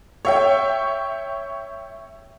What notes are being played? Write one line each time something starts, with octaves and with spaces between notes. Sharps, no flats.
C#5 E5 G5